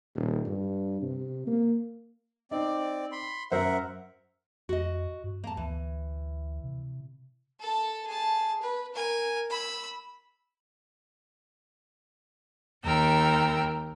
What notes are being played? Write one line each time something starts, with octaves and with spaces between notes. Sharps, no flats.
D#1
G2
C3
A#3
C4 D#4 D5
B5 C6
F#2 A#4 C5 E5 F#5
F2 F#4 D#5
G2
A#3 A5
D2 E3
C3
A4 A5
G#4 A5
B4
A#4 G#5
B5 E6
D#2 A#4 G5 E6